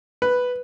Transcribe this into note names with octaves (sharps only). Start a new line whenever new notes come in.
B4